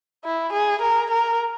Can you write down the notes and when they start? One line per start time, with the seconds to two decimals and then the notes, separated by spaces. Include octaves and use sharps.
0.24 E4
0.53 G#4
0.81 A#4
1.11 A#4